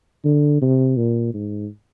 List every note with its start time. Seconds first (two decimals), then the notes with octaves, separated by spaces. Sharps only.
0.25 D3
0.62 C3
0.97 A#2
1.34 G#2